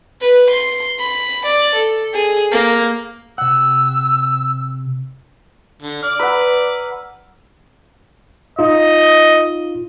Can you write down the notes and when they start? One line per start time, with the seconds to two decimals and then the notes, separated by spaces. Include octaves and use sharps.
0.21 B4
0.50 C6
0.99 B5
1.45 D5
1.74 A4
2.14 G#4
2.52 A#3
3.38 C3 F#5 E6
5.82 D3
6.03 D5 F6
6.19 B4 F#5 A#5 E6 B6
8.59 D#4 F4 D#5